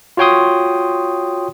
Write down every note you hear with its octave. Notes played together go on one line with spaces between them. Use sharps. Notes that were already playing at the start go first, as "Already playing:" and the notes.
F4 F#4 C#5 G5 C6 D#6